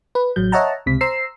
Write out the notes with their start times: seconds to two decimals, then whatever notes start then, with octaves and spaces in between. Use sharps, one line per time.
0.15 B4
0.36 A1 F#3 G6
0.52 C#5 D#5 E5 F#5 A5 A#5
0.86 C#2 C3 B6
1.01 C5 A#5 E6 C7